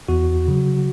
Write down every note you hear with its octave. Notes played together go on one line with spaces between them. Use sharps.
E2 F#4
C#3 F#3